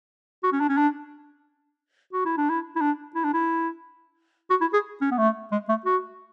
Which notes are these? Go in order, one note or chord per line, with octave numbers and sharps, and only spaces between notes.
F#4
C#4
D4
C#4
D4
F#4
E4
D4
E4
E4
D4
E4
D4
E4
F#4
E4
G#4
C#4
B3
A3
G#3
A3
F#4